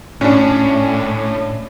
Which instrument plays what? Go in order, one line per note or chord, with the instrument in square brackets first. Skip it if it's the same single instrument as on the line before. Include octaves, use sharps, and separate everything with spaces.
[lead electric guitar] A2 [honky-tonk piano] C#4 D4